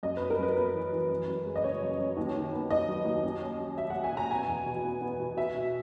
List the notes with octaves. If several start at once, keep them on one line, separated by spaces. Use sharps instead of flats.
F#2 D#5
B3 B4
A#4
F#2 B4
B3 B4
E3
E3
F#2
F#2
G#3
D#5
C#3 C#5
F#2
F#2
D#2
D#3
B3
D#2 D#5
F#3
D#2
C#4
C#4
F#3
F#3 E5
F#3 F#5
G#5
B2 A#5
B3 G#5
E2
B2
B3
B3
B2
B2 E5
B2